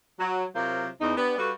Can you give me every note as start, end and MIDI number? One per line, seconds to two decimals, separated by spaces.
0.20 0.45 54
0.56 0.88 48
0.56 0.88 54
0.56 0.88 60
0.56 0.88 65
0.56 0.88 70
0.56 0.88 72
1.01 1.15 40
1.01 1.15 63
1.17 1.36 59
1.17 1.36 62
1.17 1.36 67
1.37 1.51 55
1.37 1.51 66
1.37 1.51 69
1.37 1.51 71
1.37 1.51 77